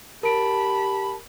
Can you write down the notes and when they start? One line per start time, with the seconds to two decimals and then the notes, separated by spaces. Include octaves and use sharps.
0.23 G4 A#4 A5 B5 D7